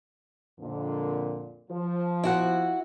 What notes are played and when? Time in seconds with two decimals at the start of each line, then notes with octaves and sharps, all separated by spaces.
0.60 F2 A#2 D3
1.71 F3
2.24 E4 F#4 F#5